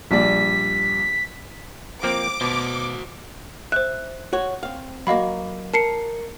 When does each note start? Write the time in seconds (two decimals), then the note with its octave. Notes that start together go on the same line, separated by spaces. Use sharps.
0.11 A#1 G3 D5 B6
2.03 F3 A#3 C4 D6
2.41 B2 F#4 C5
3.72 C5 E5 F#6
4.33 F#4 C#5
4.63 C4 F5
5.07 F#3 A#3 D#5 F5 B5
5.73 A#4 A5 C7 C#7